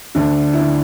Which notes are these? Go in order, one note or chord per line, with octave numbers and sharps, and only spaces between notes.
D2 D3 D4
E4
D4